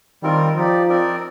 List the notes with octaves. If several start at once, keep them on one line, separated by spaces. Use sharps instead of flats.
D#3 G3 C4 F4 A#4
F3 D#4 G4 D5
C4 D#4 A#4 D5